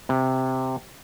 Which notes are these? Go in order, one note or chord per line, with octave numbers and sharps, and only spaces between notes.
C3